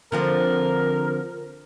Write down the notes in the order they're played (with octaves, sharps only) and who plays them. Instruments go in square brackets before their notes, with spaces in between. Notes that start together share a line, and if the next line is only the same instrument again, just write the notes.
[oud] D3 F3 C4 [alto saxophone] A#4